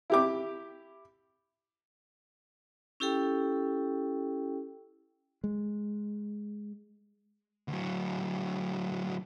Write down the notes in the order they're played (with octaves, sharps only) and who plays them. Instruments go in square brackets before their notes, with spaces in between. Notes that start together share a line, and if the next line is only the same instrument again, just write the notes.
[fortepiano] E4 G4 D6
[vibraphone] C#4 E4 G4 A4 G5
[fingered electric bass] G#3
[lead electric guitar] D2 F#3